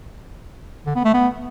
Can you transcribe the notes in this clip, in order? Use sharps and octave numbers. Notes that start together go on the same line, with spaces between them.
D3
B3
A3
B3